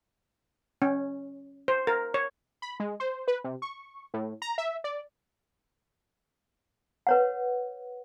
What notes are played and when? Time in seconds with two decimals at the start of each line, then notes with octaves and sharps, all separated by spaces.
0.82 C#4
1.68 C5
1.87 A#4
2.14 C#5
2.62 B5
2.80 G#3
3.00 C5
3.28 B4
3.44 C3
3.62 C#6
4.14 A2
4.42 A#5
4.58 E5
4.84 D5
7.07 B4 C#5 F#5